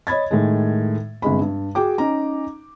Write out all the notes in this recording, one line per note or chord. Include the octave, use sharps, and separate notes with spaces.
C#5 D#5 B5 G#6 A6
A2 D#3 G#3
G1 C3 G#3 B5
G2
F#4 G#4 G5 D6
C#4 D#4 A#5